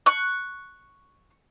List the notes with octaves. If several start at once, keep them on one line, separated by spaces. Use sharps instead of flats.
C#6 F#6